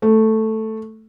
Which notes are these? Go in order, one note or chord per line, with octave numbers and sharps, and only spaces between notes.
A3